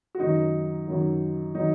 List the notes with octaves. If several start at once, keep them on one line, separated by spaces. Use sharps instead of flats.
F#4
F#2 D#3 F#3 D#4
F#2 D#3 F#3
D#3 F#3 D#4